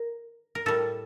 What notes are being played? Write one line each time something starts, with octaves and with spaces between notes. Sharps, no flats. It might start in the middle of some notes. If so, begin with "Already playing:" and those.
Already playing: A#4
A#4
A2 G3 A4